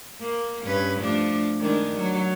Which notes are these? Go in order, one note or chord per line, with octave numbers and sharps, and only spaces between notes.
A#3
G2 C#4 B4
F3 A3 D4
D#3 G#3 D4
F#3